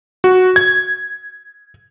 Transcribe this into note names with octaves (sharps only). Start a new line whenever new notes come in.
F#4
G#6